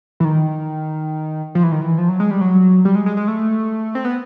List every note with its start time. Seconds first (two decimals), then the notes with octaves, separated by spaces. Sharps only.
0.20 E3
0.25 D#3
1.55 F3
1.64 E3
1.72 D#3
1.81 E3
1.98 F3
2.09 F#3
2.20 G#3
2.31 G3
2.41 F#3
2.85 G3
2.95 G#3
3.06 G#3
3.17 G#3
3.28 A3
3.95 C4
4.05 B3